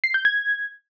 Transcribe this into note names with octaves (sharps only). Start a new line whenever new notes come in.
C7
G6
G#6